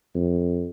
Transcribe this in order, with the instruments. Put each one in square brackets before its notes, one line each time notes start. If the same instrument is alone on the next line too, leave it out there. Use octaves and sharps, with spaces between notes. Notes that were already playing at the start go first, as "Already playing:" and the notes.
[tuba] F2